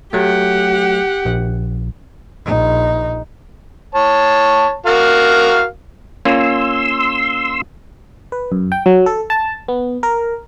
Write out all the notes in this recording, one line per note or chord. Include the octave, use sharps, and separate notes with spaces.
F#3 A3 G4 F#5
A#1
A#1 D#4
C#5 A5
F#4 A#4 F5
A#3 C#4 F4 C6 E6
B4
F#2
G5
F#3
A4
A5
B3
A#4